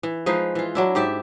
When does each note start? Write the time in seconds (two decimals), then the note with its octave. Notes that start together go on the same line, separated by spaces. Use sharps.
0.03 E3
0.26 F3 G#3 D#4 B4
0.55 E3 F4
0.75 F#3 D4 E4
0.95 G#2 G4 D5 E5